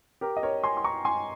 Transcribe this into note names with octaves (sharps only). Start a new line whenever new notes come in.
G4 A#4
D#5
A#4 C#5
G#5 C6
C6
A#5 C#6
G#5 C6